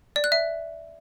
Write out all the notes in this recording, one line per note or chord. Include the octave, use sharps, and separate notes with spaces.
D5
F#6
E5